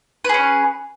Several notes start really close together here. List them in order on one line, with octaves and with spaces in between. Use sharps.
B4 G#4 C#4